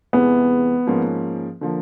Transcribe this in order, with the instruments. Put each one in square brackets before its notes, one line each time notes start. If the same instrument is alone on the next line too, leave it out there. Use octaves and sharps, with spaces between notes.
[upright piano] E2 C3 E3 G#3 [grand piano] B3
[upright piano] G#2 F3 A#3 C#4
D3 F3 A#3